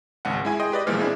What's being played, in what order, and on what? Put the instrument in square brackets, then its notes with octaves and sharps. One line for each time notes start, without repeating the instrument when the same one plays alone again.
[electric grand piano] G#1 C#2 F#5
G#3 E4 G#5
G#4 D#5 G5 C6
G4 B4 D5 D#5
B1 A#2 E3 F3 G#3 F6
C4 D4 E4 G#4